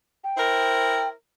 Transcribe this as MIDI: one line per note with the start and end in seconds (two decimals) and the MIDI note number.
0.24 1.08 79
0.37 1.12 64
0.37 1.12 70
0.37 1.12 72